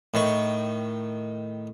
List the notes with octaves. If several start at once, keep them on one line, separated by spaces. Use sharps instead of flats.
A2 D#3 C#6